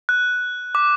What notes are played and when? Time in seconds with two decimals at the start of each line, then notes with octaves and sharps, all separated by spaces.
0.09 F#6
0.75 D6